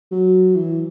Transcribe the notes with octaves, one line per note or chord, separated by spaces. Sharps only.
F#3
E3